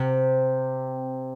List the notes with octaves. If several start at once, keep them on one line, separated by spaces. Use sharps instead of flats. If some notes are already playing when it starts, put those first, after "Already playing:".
Already playing: C3